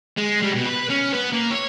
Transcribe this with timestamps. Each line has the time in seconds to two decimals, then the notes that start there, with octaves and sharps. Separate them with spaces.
0.17 G#3
0.42 G3
0.54 B2
0.65 B4
0.89 C#4
1.12 B3
1.32 A#3
1.51 C#5